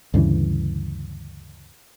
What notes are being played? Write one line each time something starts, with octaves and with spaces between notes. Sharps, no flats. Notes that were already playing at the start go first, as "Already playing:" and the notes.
D2 G2 C#3 E3